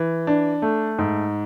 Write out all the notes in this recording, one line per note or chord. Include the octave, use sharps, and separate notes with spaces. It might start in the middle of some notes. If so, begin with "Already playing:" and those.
Already playing: E3
D4
A3
G#2